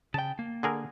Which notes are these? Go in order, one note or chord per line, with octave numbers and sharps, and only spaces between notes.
C#3 G5 A5
A#3
D3 G#4 A#4